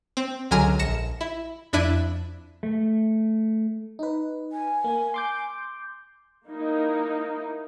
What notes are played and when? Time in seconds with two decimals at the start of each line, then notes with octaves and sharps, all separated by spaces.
0.17 C4
0.51 C#2 D3 F#3 G#5 A#5 F6
0.79 A#1 A#6 C#7 E7
1.21 E4
1.73 F2 D4 E4 F#6 D#7
2.63 A3
3.99 D#4 B4
4.52 G#5
4.84 A#3
5.14 C6 D6 G6
6.48 A#3 D#4 E4